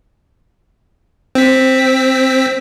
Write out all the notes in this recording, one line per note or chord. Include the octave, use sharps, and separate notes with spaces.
C4 B6